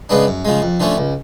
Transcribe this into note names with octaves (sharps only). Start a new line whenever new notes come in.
C#3 G#3 B3 D4
F#2
C#3 F3 G#3
F2
D3 F3 A3 C#4
C#2